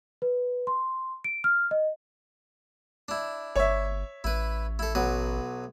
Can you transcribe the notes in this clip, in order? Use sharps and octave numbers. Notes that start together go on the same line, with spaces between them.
B4
C6
D7
F6
D#5
D4 E4
G1 C#5 E5
A1 E4 B4
E4 A4
B1 F#3 B4